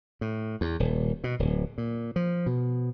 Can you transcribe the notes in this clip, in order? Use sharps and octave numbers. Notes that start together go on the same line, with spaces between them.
A2
E2
D#1
B2
D1
A#2
F3
B2